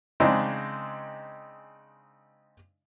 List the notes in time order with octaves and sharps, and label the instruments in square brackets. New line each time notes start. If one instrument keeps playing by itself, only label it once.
[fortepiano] C#3 G#3 C4 D4 D#4